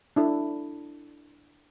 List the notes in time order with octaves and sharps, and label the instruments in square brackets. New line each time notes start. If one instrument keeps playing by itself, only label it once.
[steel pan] D4 E4 A4